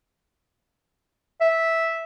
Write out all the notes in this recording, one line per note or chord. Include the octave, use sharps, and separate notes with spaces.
E5